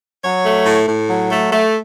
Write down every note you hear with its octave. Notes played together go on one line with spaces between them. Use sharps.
F#3 C#5
A3
A2
A2
F#3
A3
A3